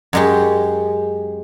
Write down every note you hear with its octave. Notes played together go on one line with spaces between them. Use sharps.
F#2 G#3 G4